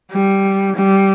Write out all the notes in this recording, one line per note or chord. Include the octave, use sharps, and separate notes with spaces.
G3
G3